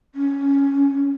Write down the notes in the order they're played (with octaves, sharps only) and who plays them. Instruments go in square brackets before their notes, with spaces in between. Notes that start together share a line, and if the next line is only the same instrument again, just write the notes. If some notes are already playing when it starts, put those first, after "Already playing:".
[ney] C#4